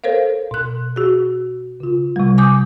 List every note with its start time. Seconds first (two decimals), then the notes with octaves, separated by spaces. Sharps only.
0.04 A4 A#4 C5 C#5 F5
0.51 B2 F#6
0.96 F#4 G#4
1.80 C#3 F4
2.16 C3 G3
2.38 G#5 D6 D#6 G6